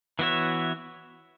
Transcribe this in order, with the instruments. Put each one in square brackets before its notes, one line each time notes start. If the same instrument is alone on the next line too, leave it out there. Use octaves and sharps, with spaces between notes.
[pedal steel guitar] E3 B3 F#4 C#5 E5